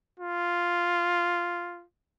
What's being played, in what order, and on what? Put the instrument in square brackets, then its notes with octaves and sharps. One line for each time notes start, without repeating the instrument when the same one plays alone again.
[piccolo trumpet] F4